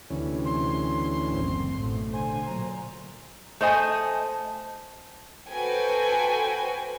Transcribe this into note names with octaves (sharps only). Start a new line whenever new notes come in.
D2 C3 E3 C#4
C6
F#1 A2 C4
A1 B2 A3
D3 C5 G#5
A#2 F#3 A#5
A3 C5 D#5 G#5 A5
F#4 A4 B4 C5 G5 G#5